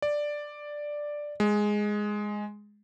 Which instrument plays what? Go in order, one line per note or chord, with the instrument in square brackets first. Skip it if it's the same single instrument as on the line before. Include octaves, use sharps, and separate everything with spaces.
[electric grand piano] D5
G#3